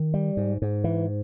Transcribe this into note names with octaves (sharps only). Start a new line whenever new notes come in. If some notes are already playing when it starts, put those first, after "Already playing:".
Already playing: D#3
G3
G#2
G#2
E3